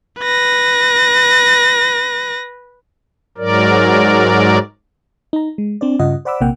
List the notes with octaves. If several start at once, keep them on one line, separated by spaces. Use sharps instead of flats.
B4 A#6
G#2 F#3 A#4 D5
D#4 A#5
G#3
C4 D4 C5 D5
G2 C#3 F4 D#5 F#5
C5 D5 F#5 B5 D6 E6
A#1 C3 A#3 F#5 G5